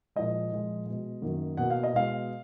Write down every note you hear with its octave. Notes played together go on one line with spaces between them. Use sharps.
A#2 F3 G#3 D#5
A#2 F3 G#3
B2 G#3
F#2 D#3 F#3 A#3
B2 A#3 F#5
F5
D#5
B2 G#3 F5